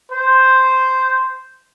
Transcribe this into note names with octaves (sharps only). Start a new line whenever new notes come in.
C5